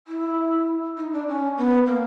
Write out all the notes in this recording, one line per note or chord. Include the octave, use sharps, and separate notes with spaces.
E4
D#4
D4
C#4
B3
A#3